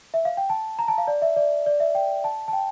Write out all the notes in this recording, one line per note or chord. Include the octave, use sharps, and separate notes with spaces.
E5
F5
G5
A5
A#5
A5
F5
D5
E5
D5
D5
E5
G5
A5
A5
G5